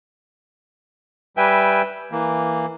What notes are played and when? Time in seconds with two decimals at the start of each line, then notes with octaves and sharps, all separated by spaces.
1.37 G3 B4 E5 G5 G#5
2.12 E3 A#3